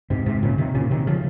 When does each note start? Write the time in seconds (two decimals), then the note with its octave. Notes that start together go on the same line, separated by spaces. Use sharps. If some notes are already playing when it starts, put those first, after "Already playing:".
0.10 G#2 C3
0.26 G#2 C3
0.43 A#2 C#3
0.58 C3 D#3
0.75 A#2 C#3
0.91 C3 D#3
1.07 C#3 F3